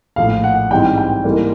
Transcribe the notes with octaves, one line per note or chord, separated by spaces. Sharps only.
A#1 A2 F3 F5
F#5
G#2 E3 G3 C4 D#4 G5
G5
G#2 E3 G3 A#3